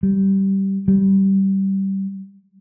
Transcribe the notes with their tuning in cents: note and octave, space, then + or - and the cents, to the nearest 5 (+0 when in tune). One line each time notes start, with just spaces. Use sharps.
G3 -15
G3 -15